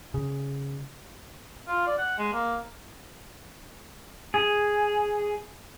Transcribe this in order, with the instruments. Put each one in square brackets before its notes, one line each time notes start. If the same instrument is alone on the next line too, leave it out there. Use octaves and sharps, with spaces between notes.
[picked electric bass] C#3
[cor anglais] F4
D5
F#5
G#3
A#3
[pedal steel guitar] G#4